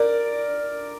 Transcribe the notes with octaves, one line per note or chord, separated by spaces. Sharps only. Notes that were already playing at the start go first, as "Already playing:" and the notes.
Already playing: A#4 D5